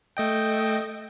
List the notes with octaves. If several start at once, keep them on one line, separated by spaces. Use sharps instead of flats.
A3 D#5 G5